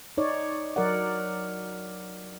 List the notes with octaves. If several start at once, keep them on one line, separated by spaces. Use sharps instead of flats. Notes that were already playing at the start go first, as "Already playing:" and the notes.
D#4 C#5 D5
F#3 A#4 D5 F#5